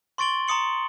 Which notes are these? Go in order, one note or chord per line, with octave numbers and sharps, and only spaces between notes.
C6 C#6 A6 D7 F#7 G7
A#5 C6 D#6 C#7 F#7